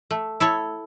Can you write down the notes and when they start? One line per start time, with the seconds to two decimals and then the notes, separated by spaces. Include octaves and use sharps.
0.11 A3
0.40 E4 A4 C#5